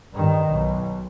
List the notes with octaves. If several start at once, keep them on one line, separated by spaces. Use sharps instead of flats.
G2 D#3
B1